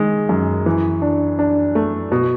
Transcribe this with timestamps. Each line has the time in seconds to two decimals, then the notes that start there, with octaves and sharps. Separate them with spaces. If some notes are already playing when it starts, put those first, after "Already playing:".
Already playing: D#3 G#3
0.29 F#2
0.66 E3
1.02 D4
1.39 D4
1.75 A3
2.12 B2